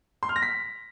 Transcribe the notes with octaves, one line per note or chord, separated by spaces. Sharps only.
C6
F6
A#6
B6